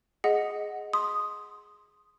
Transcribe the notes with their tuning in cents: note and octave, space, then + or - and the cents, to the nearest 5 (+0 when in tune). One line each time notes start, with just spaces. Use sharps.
G#4 +0 D#5 +0 F#5 +0
C6 +0 D#6 +0